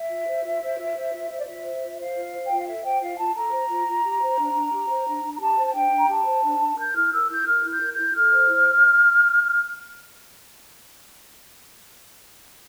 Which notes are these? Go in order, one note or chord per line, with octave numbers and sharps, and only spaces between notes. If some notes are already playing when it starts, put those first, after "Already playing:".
Already playing: E5
F4
C5
F4
C5
F4
C5
F4
C5 E5
D5
F4 E5
C5
F4
C5 F5
F4
C5
G5
F4
F5
A4 E5
C5 G5
F4 F5
F4 A5
A4 A#5
C5
F4
F4
G4
C5
D4
D4
G4
C5
D4
D4
A#5
G4 A5
C5
A5
D4 G5
D4
A#5
G4 A5
C5
D4
D4
A#4 G6
E4 F6
A#4 E6
E4 G6
A#4 F6
E4
G6
A#4
G6
E4
A4 F6
C5
E4